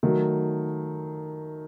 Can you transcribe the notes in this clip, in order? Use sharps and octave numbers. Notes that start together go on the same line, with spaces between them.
D#3 F#3 A3